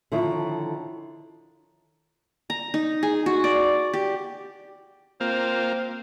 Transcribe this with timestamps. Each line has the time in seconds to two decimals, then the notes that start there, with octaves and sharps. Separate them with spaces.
0.12 D3 D#3 F3 E4 F4 C#5
2.50 A#5
2.74 D#4
3.03 G#4
3.26 F#4
3.44 D5
3.94 G4
5.20 A#3 C4 F4